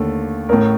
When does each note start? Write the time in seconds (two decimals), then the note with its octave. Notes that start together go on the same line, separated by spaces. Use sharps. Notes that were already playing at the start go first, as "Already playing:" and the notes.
Already playing: D#2 D3 A3 A4
0.49 A1 A2 A3 A#4